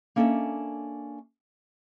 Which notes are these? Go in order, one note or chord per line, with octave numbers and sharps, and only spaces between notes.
A#3 C#4 D4 A4 D#5 E5